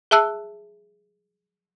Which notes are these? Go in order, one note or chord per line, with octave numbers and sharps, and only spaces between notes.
G#4 E5 A5 E6 F#6